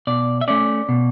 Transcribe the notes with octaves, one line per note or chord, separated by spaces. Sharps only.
B2 D5
E5
A3 C#4 D5
B2